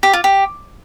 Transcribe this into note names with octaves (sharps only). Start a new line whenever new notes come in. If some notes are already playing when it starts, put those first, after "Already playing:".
G4
F4
G4